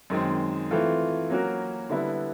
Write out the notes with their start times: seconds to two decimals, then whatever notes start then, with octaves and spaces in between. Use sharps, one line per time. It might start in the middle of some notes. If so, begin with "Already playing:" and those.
0.10 F#2 D#3 G#3 C4
0.71 E3 A3 C4 F4 A4
1.30 F#3 A#3 C#4 F#4 A#4
1.90 D3 G3 B3 E4